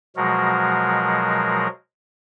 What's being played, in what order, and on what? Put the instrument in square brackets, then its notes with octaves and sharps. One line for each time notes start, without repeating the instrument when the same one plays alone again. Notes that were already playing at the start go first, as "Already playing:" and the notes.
[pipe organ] B2 F3 F#3 G#3 F#4 A#4